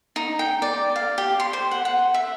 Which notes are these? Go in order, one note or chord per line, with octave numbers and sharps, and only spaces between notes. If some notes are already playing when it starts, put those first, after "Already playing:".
D#4
G5
D5
F5
G4
C6
C5
F#5
F#5
E5